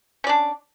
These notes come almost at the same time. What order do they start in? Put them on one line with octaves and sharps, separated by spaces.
C#4 D5 D4